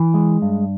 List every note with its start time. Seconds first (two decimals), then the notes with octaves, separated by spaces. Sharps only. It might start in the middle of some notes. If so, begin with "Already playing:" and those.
Already playing: E3
0.14 G#3
0.42 G2